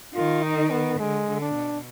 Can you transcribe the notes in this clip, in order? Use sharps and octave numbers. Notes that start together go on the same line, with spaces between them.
D#3 F4
D#4
B3
D3 G#3
D3
D4
B2